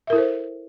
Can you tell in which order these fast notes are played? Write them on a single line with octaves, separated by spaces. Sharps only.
E5 A#4 E4 A4 C5